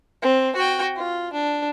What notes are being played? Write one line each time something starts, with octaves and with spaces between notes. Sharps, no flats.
C4
F#4 G5
F4
D4